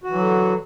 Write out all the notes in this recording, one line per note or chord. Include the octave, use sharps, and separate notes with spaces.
D3 E3 F#3 F#4